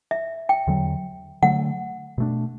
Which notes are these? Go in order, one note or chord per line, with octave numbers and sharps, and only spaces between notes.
E5
G5
E2 D3 F#3
D3 F#3 A3 F#5
B2 A3 D4